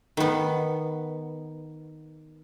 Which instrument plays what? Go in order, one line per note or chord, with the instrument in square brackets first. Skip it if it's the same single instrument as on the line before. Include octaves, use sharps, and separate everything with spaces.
[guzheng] D#3 B3